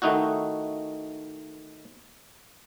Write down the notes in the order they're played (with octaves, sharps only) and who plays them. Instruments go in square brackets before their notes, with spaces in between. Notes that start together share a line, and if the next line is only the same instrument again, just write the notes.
[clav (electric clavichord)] D#3 A3 D#4 E4 F#4